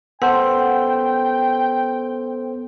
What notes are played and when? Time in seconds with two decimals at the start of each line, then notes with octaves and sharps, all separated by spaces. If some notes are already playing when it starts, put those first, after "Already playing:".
0.22 B3 A4 C5 F#5 G5